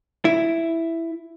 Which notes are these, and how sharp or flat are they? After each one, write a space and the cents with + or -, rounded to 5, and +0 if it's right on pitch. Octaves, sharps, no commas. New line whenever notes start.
E4 +5